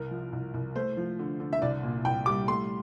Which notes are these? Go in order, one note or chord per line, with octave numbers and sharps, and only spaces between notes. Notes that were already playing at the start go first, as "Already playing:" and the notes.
Already playing: C2 A#4
F3
C2
C2
A3 C5
F3
D3
D3
E5
C2 D5
A#2
C2 G5
G3 D6
A3 C6